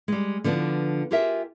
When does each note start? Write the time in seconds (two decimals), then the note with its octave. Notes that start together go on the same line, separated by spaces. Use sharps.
0.08 G3 G#3
0.44 D3 F3 B3 D4
1.11 F4 G4 G#4 A#4 E5